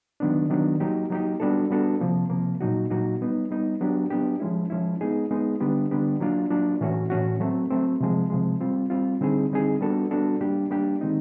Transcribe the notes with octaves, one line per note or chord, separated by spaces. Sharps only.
D#3 F#3 B3 D4
D#3 F#3 B3 D4
F#3 A#3 D#4 G4
F#3 A#3 D#4 G4
G3 B3 D4 F#4 A4
G3 B3 D4 F#4 A4
C3 F3 A#3
C3 F3 A#3
A#2 F#3 A#3 D#4 F#4
A#2 F#3 A#3 D#4 F#4
G3 B3 D#4
G3 B3 D#4
F#3 B3 D4 G4
F#3 B3 D4 G4
F3 G#3 C#4 E4
F3 G#3 C#4 E4
G#3 B3 D#4 G#4
G#3 B3 D#4 G#4
D3 G3 B3 D4 G4
D3 G3 B3 D4 G4
F#3 A#3 D4 F4
F#3 A#3 D4 F4
A2 E3 A3 C#4 F#4
A2 E3 A3 C#4 F#4
F#3 A3 C4
F#3 A3 C4
C3 F3 G#3
C3 F3 G#3
G3 C4 F4
G3 C4 F4
D3 G3 C4 D#4 G#4
D3 G3 C4 D#4 G#4
G3 B3 D4 F#4 A4
G3 B3 D4 F#4 A4
G3 A#3 D4 G4
G3 A#3 D4 G4
D#3 G#3 C4 D#4